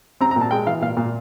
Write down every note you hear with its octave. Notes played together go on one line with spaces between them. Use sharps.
C4 A#5
A#5
A#2
A5
G#3 G5
E3 F5
A#2 F5
A#2